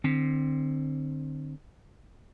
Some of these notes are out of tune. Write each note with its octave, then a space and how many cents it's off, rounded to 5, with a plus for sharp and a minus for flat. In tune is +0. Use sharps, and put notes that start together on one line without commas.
D3 +35 C4 +5